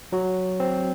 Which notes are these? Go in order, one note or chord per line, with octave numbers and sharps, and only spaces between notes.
F#3 F#4
C4